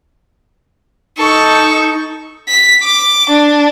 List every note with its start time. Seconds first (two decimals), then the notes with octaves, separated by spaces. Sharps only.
1.18 D#4 A4 C#6
2.48 B6
2.83 D6
3.30 D4